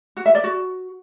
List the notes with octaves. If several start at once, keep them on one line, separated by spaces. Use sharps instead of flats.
F#4
E5
D5
F#4